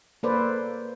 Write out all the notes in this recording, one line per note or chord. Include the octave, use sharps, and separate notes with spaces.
A#3 A4 B4 C5 D5